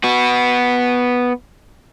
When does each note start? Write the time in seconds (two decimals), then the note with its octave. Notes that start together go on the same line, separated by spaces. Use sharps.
0.04 B3 F#4